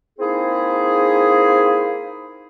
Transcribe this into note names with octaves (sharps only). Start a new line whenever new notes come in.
A#3 C4 D#4 E4 G#4